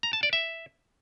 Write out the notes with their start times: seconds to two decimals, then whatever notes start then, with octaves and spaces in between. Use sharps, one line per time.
0.03 A#5
0.13 A5
0.23 D5
0.33 E5